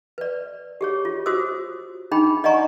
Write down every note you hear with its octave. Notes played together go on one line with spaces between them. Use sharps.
B4 D5
G4 G#4 C#5
F4
F4 F#4 G#4 C5 D#6 E6
D4 D#4 G#4 G5 B5
D5 D#5 F#5 G#5 A#5 C#6